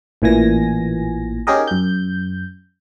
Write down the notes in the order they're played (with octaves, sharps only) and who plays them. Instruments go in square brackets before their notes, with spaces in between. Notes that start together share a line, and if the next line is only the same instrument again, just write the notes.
[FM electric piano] A1 A#2 E3 G#5 A#6
C#4 D#4 G4 G#4 A#4 D#5
F#2 G6